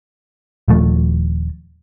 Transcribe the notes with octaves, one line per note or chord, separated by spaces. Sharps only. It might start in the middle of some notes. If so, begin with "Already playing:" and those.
D#1 F3 A3